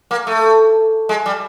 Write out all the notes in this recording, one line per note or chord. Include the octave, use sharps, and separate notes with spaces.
A#3
A3
G#3
G3